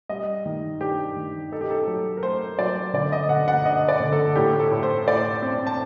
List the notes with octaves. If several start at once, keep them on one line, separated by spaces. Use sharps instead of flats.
G3 D#5
D#3
D4 G4
D#3
D#4 A4
G4
A4
F#3
A#4
A3 C5
F#3 D5
D3 D5
D#5
D3 F#5
F#5
D4 D#5
D5
D3
A4
A2 G4
A4
A2
C5
A2 D5
C4
A5